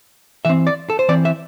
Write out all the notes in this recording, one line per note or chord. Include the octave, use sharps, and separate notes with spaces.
E3 C4 E5
D5
A4
C5
E3 C4 D5
E5